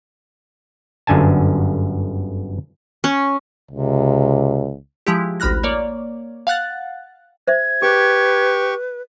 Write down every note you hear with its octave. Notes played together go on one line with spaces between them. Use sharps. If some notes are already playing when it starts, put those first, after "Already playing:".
G1 F#2 D3 G#5 A5
C#4
C#2 C3
F3 G#3 E4 G4
A1 D2 B5 F6 F#6 A#6
A#3 C#5 D5
F5 F#5 F#6 A6
C5 E5 G#6
G4 G#4 B4 C#6